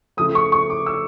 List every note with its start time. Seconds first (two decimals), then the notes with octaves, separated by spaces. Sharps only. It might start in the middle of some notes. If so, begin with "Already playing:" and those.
0.17 C#3 F3 A3 D#6
0.35 C#6
0.52 C#6
0.70 D6
0.86 E6